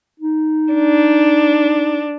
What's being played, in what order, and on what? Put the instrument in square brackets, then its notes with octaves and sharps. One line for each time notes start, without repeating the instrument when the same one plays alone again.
[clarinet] D#4
[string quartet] D4